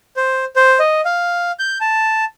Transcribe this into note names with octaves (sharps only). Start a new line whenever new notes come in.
C5
C5
D#5
F5
G6
A5